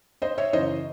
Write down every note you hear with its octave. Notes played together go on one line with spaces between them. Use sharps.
C5 D#5
C#5 E5
F#2 C#3 E3 C5 D#5